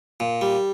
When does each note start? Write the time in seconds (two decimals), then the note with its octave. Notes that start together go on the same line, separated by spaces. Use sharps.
0.20 A#2
0.41 G3